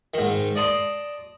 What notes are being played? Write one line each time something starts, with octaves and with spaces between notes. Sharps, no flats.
G#2 D#3
D5 D#5 A5 C6